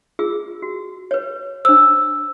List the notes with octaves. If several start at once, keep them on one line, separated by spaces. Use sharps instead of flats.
F4 G#4 E6
F#4
B4 C#5
D4 C5 E6